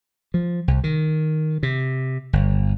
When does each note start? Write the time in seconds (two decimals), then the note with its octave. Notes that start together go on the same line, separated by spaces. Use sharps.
0.34 F3
0.68 C2
0.84 D#3
1.63 C3
2.33 G1